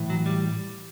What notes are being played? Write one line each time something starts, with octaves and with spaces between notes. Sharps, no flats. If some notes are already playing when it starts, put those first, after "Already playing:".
Already playing: A2 E3
F#3
G3